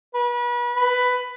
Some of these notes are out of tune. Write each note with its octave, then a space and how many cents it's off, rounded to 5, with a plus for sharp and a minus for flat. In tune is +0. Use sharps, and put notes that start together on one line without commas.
B4 -35
B4 +10